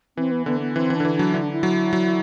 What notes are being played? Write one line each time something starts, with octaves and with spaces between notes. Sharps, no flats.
E3 C4
B3
D3 B3
B3
E3 C4
E3
D3 D4
E3
F#3 D4
D3 E4
D4
E4
F#3
F#3